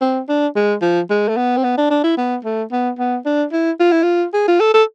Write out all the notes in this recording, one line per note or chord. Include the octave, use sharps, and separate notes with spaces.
C4
D4
G#3
F3
G#3
A3
B3
C4
B3
D4
D4
E4
B3
A3
B3
B3
D4
E4
F4
E4
F4
G#4
F4
A4
A4